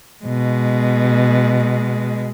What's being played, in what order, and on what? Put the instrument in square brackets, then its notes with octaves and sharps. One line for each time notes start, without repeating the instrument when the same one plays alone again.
[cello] B2 G#3